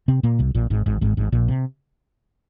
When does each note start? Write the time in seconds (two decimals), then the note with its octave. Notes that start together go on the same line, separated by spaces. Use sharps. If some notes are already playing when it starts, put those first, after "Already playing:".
0.08 C3 C4
0.23 A#2 A#3
0.39 C2 C3
0.55 A#1 A#2
0.70 G#1 G#2
0.86 G#1 G#2
1.01 G#1 G#2
1.17 G#1 G#2
1.32 A#1 A#2
1.48 C3